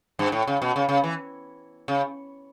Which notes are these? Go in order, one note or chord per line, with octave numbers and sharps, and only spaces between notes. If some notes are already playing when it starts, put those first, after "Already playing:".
G2
A2
C#3
B2
C#3
C#3
E3
C#3